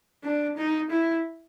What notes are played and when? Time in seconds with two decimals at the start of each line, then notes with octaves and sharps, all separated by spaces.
0.24 D4
0.57 D#4
0.90 E4